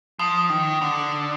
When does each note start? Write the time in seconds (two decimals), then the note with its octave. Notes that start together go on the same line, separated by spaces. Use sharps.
0.19 F3 D#6
0.50 D#3
0.81 D3